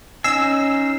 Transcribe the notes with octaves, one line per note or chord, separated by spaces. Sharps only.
C#4 D#4 G#5 E6 C7